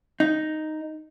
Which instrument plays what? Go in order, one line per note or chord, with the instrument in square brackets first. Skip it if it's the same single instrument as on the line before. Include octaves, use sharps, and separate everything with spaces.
[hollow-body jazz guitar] D#4